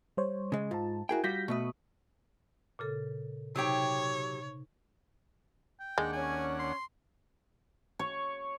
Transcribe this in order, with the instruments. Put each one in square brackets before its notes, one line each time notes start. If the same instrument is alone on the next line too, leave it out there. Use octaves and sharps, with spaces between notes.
[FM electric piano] G3 C5 C#5
[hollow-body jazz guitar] C#3 G#3
[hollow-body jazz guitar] G#2 [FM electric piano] F4 A5
[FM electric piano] E4 A#4 G#5 [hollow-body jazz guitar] F#4 G#4 G5
[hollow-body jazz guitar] G3 F4 F#4 [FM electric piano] G6 A#6 B6
[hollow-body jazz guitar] B2 A3 B4 [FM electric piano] C#6 D#6
[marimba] A#2 C#3 A4
[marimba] C3 D#4 [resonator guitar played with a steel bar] F#3 G4 G5 [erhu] C#5
[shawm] G5
[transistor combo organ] D#2 D4 F#5 [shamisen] G#3
[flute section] C#4 [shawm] G#5
[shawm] C6
[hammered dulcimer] C#5